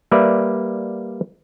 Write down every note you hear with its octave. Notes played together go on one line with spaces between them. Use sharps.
G3 A#3 B4 D5 E5